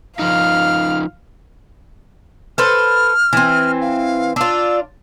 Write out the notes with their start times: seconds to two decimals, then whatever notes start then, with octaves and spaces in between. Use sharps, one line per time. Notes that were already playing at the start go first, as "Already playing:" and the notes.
0.19 F3 D#4 F5 F6
2.58 A4 B4 C5 F6
3.33 E3 C4
3.81 F5
4.36 D4 F4 E6